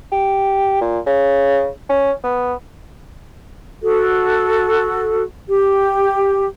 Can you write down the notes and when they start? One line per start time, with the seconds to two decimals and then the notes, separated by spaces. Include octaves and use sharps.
0.12 G4
0.81 A#2
1.07 C#3
1.89 C#4
2.24 B3
3.82 F#4 A4
5.49 G4